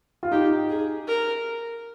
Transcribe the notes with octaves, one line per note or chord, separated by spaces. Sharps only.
F4
D#4 G4
G#4
A#4